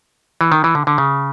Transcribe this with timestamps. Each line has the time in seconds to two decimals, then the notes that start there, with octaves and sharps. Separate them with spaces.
0.41 E3
0.52 D#3
0.64 E3
0.75 D3
0.87 D3
0.98 C#3